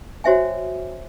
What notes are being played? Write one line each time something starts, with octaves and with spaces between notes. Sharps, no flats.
F#4 C5 C#5 E5 G5 G#5